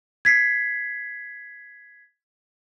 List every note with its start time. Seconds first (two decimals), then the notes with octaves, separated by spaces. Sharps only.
0.25 G#6 B6 C7